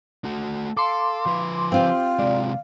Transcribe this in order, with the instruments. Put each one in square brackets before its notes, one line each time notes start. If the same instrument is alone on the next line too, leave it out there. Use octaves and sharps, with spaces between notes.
[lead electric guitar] A3 F#4
[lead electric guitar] A4 [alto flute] F5 [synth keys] C6 D6
[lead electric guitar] F3 B4
[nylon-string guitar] C4 F4 G4 [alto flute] F5
[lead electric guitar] C3 G#3 [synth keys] D5